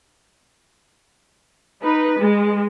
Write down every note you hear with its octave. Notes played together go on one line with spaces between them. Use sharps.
D#4 B4
G#3